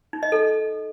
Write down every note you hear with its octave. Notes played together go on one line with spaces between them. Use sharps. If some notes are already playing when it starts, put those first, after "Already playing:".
D#4
D#5
A4